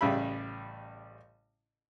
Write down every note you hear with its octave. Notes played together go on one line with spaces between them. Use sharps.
A1 C#3 G3 E5 B5